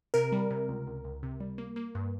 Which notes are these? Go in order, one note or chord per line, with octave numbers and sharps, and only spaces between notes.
C3 A#4
G3
C3
C#2
C#2
C#2
C3
G3
A#3
A#3
G2